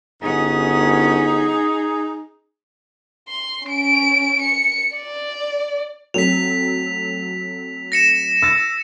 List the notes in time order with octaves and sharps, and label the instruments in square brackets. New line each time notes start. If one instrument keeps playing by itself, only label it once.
[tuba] G1 [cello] C#4 F#5 [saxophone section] D#4 G#4
[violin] C6
C#4 D7
C#7
D5
[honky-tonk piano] F#3 A3 C4 [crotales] B6 F7
[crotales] A#6 C#7 E7
[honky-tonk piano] E6 A6